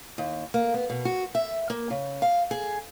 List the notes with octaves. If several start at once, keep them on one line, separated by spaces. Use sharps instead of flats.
D#2
A#3
B3
B2
F#4
E5
A#3
C#3
F5
G#4